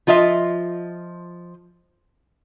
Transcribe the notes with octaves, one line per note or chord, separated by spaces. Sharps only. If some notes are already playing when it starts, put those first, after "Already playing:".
F3 F4 D#5 E5